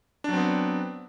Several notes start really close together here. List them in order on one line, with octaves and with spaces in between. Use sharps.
D4 F#3 C4 B3